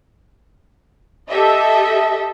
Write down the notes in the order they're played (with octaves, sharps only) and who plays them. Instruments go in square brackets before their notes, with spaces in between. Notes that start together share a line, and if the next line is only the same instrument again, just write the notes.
[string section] G4 A4 D#5 E5